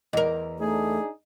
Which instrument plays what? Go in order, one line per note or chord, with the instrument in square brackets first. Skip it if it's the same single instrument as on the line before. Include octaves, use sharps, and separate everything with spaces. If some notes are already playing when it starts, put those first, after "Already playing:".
[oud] E2 A#4 [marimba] D#5
[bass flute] A3 [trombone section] D4 D#4 G#4